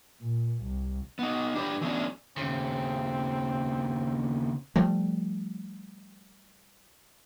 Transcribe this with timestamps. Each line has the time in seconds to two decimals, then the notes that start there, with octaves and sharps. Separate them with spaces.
0.21 A#2
0.63 C2
1.19 B3 D#4
1.55 D4 G4 B4 C#5
1.81 E3 F#3 A3 B3 C#4 D4
2.37 D#2 C#3 C4
4.76 F3 G3 A3